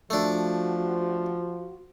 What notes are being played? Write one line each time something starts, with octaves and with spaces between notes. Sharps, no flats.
F3 A3 D4 F#4